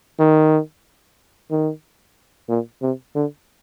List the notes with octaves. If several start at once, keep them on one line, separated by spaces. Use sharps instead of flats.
D#3
D#3
A#2
C3
D3